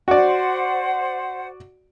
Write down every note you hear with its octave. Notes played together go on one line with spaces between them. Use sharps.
F#4 C5 D5 F#5